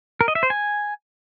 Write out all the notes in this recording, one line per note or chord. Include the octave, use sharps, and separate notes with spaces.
A#4
D#5
E5
C5
G#5